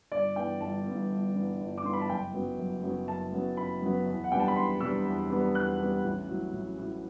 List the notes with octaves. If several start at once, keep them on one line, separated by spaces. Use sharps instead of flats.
G1 D5
G2 E3 B3 G5
G1 A5
G2 E3 B3
G1
G2 E3 B3
G1
D6
G2 E3 B3 C6
B5
A5
F#1 G5
F#2 F#3 B3
F#1
F#2 F#3 B3
F#1 A5
F#2 F#3 B3
F#1 B5
F#2 F#3 B3
E2
F#5
C3 G3 B3 D4 G5
A5
B5
E2 C6
C3 G3 B3 D4 E6
E2
C3 G3 B3 D4
E2 F#6
C3 G3 B3 D4
A1
A2 F#3
A1
A2 F#3